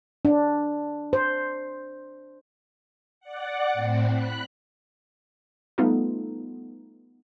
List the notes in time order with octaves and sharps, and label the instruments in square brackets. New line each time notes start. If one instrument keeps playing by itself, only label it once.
[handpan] D4
C5
[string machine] D5 F#5
A2 C4
B5 F#6
[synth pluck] G3 A3 B3 D#4 F4 A4